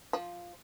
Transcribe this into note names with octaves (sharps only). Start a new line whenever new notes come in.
F3